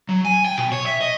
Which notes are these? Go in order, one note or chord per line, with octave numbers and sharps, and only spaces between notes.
F#3
G#5
G5
B2
C#5
E5
D#5